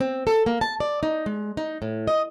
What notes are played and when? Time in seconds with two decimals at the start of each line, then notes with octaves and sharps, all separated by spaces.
0.01 C4
0.27 A4
0.46 A#3
0.61 A5
0.80 D5
1.03 D#4
1.26 G#3
1.57 D#4
1.82 A2
2.07 D#5